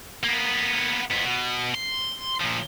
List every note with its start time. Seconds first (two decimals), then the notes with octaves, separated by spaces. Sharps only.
0.24 A#3 B3
1.10 F2 B3
1.25 B2
1.75 C6
2.41 A#2 F3